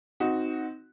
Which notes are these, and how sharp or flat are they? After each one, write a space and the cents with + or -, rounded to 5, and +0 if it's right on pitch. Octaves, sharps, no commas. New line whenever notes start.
C4 -10 D#4 +15 F#4 +0